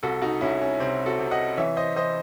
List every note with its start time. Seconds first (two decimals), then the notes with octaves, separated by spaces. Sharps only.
0.03 C2 F#4 A4
0.22 D#4 F#4
0.41 C2 C#4 E4
0.61 C#4
0.80 C3 C4
1.06 F#4 A4
1.19 C3
1.31 D#5 F#5
1.57 E3 C#5 E5
1.77 C5 D#5
1.96 E3 C5 D#5